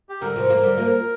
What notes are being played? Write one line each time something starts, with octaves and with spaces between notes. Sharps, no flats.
G4
D3 G3 A#4
C3 F3
F3 A#3
D3 G3
F3 A#3